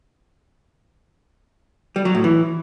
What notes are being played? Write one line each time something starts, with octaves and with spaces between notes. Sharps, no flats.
G3
F#3
A2
E3